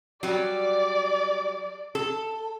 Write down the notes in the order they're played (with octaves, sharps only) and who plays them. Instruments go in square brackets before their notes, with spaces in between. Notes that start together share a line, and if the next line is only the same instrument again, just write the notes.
[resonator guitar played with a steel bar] F#3 G3 [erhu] D5
[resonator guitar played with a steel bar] A4